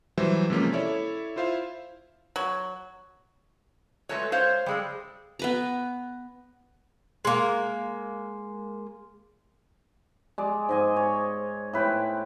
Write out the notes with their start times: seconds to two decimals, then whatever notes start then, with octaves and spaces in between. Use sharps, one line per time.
0.18 E3 F#3 G3 C5 E5
0.50 C3 F3 G#3 A#3 C#4
0.73 E4 A4 C#5 D5 E5
1.36 E4 F4 C5 E5 F5
2.36 F#3
4.09 G#3 A3 F#4 A4 B4 C#5
4.32 G#3 C5 C#5 F5
4.66 G3 G#3 A4
5.39 B3 B4 A#5
7.25 G#3 A#3
10.38 G#3 D5
10.69 G#2 D#5 G#5
10.96 C#5
11.73 A2 B4 C5 G5